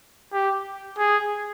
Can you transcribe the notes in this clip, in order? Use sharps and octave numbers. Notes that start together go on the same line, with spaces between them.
G4
G#4